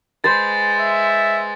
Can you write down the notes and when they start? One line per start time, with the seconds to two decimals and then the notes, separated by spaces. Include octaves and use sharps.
0.24 G#3 B4 C5 A6
0.80 E5